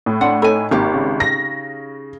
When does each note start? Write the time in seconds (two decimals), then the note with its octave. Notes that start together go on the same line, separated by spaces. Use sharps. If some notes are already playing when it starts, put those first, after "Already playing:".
0.06 A2
0.21 D4 F#5 C6
0.42 D#4 A4 C#5 G#5 B5
0.71 G#1 A#3 D#4 G4
0.94 C#3
1.20 A#6